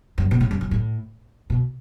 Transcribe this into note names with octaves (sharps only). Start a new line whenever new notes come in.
F#2
B2
A2
F#2
F#2
A2
B2